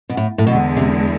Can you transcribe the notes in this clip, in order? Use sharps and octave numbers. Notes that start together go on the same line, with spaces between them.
B2
A2
A2
E2 B2 D3 G#3
C3